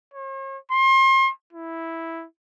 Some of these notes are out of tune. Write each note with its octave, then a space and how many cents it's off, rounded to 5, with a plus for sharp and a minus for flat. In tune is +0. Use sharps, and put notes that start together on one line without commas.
C#5 -45
C6 +35
E4 -5